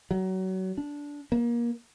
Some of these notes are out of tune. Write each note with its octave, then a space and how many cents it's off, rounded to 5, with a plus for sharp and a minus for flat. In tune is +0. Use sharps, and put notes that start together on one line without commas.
F#3 +25
D4 -15
A#3 +25